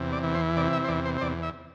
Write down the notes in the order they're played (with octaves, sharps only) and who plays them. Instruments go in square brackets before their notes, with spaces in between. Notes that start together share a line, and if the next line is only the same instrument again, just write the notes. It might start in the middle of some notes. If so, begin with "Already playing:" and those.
Already playing: [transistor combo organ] E2 C3
D5
E3
C5
C3 D5
E5
C5
E2 D5
C5
C5
E2 D5
E5